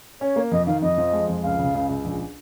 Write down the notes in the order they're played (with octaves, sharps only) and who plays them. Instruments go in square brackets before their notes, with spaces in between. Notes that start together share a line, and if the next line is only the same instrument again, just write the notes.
[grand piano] C#4 [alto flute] C#5
[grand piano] A#3
[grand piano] F2 [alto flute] D#5
[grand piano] D#3 [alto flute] F5
[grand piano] F2 [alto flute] D#5
[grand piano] F3
G#3
F2
[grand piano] C#2 [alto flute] F5
[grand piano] C#3
C#2
C#2
A#1